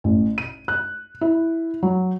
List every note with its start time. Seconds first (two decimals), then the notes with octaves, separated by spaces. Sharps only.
0.04 A1
0.38 D#7
0.68 F#6
1.21 E4
1.83 F#3